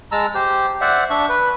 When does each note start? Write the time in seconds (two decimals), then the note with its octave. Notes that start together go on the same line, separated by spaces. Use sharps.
0.12 G#3 A5 A#5 E6
0.35 G4 C5
0.81 C5 D5 E5 F#5
1.10 D4 E5 C#6
1.29 B4